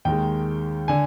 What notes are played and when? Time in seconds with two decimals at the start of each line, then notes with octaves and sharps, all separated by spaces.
0.05 D#2 D#3 G#3 G5
0.88 D3 G#5